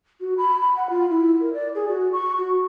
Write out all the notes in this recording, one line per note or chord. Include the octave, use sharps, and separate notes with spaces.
F#4
B5
B5
F#5
F4
E4
A#4
D5
G#4
F#4
C#6
F#4